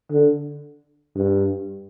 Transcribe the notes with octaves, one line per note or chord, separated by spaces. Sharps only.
D3
G2